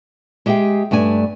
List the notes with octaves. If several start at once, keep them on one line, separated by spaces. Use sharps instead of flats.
G#3 G4 G#4 E5 G5
G2 A3 D4 G#5